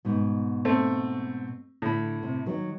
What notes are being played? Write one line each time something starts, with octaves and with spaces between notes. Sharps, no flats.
G#2 B2
A3 C4
A2 D3 B5
C3
D#3 F#3